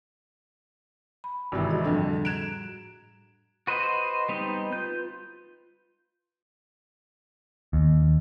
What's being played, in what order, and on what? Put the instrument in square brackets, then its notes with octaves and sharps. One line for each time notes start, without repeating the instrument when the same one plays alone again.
[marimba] B5
[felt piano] G#1 C3 E3
[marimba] F#4 G#4 D#5
[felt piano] F2 D3 [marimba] A2 G3
[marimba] A#5 F#6 G#6 [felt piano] D7 E7
[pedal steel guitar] F#4 B4 C5 D#5
G3 B3 C4 D#4
F4 B4 G6
[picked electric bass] D#2